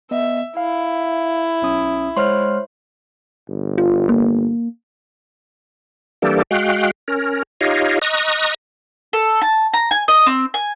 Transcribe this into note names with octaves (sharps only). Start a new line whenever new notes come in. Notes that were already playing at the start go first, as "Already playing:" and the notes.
B3 D#5 E5
E4 F5
B1 C#4 D#6
G#3 C5 C#5 F#5 C6 F6
G1
F4
A#3
E3 G3 A#3 D4 G4 A4
G#3 F#4 F5 G5 F#6
C#4 A#4
D#4 F4 G4 C#5 D#5 F5
D#5 A#5 C#6 D#6 F#6
A4
A5
A#5
G#5
D#5
C4
G#5